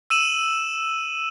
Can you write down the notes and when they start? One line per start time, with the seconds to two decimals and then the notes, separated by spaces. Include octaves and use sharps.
0.10 E6 D#7 E7 F#7